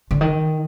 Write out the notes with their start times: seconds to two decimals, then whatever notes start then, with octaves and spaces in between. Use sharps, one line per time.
0.11 D3
0.21 D#3